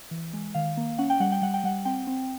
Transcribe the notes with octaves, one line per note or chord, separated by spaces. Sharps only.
E3
G#3
D#3 F5
A#3
C#4 F#5
G5
G3 F#5
G5
G3 F#5
G5
G3 F#5
C4 G5
C4